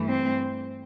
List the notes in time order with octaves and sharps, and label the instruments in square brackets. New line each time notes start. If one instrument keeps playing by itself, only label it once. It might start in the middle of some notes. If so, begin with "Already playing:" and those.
Already playing: [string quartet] G2 E3 A3
C4